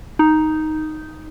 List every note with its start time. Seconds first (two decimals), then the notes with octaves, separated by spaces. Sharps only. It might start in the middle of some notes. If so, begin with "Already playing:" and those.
0.19 D#4